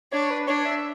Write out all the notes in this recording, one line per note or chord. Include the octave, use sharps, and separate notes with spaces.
D4 C#5
B4
D4 C#5
E5